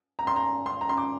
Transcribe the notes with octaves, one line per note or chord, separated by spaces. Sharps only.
A#5
C6
A#5
C6
A#5
C6
D6